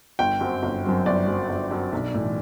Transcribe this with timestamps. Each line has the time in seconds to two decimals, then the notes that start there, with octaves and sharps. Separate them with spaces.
0.19 G1 G5
0.41 F#2 F#3 C4
0.63 G1
0.85 F#2 F#3 C4
1.06 G1 D5
1.27 F#2 F#3 C4
1.49 G1
1.71 F#2 F#3 C4
1.92 B1
2.14 A2 E3